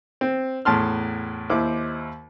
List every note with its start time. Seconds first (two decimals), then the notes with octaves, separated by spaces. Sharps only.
0.21 C4
0.65 E2 A2 A5 C6 F6
1.50 D#2 E4 C5 D6